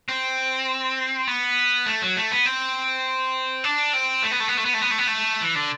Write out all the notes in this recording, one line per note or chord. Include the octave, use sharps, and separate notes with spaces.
C4
B3
A3
F#3
A3
B3
C4
D4
C4
A3
B3
A3
B3
A3
B3
A3
B3
A3
B3
A3
E3
D3